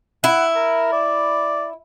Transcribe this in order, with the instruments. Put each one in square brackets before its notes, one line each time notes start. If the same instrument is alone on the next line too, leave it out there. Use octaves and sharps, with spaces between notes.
[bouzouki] E4 [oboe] F#5
[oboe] A#4
D5